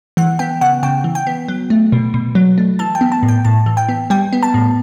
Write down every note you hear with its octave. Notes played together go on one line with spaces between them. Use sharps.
E3 F#5
B3 G5
C#3 F#5
C#3 G5
E3
G5
B3
F#3
A3
B2
B2
F#3
A3
E3 A5
G5
B3
A5
A2
G5
A2 A5
E3
G5
B3
G3 G5
B3
A5
A2